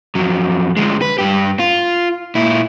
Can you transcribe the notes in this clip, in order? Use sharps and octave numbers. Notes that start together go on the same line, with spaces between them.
F2 F#3
D2 G#3
B4
G2 G4
F4
A#2 E4